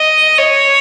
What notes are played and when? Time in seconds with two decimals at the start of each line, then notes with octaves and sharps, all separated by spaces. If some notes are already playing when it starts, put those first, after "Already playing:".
Already playing: D#5
0.38 C#5